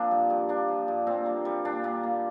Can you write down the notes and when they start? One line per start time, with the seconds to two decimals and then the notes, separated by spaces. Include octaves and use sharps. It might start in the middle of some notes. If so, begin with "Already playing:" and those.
Already playing: F3 A#3 C4 D4
0.11 G2
0.30 G2
0.49 A#3 D4
0.68 F3
0.88 G2
1.07 A#2 C4
1.26 A#3
1.45 G3
1.65 A#2 D4
1.84 A#2
2.03 A#3